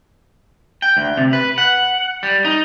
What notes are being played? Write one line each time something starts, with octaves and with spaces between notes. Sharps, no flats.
G5
D2
C3
B4
F#5
G3
D#4